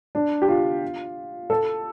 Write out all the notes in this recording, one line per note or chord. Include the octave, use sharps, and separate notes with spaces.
D4
G4
F4
A4